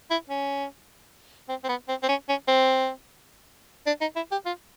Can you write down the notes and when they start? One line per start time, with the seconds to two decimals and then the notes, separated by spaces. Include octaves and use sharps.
0.11 E4
0.30 C#4
1.49 C4
1.64 C4
1.69 B3
1.89 C4
2.03 C4
2.09 C#4
2.29 C#4
2.48 C4
3.87 D4
4.01 D#4
4.16 E4
4.32 G4
4.46 F4